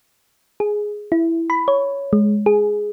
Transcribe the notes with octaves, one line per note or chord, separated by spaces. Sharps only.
G#4
E4
B5
C#5
G#3
G#4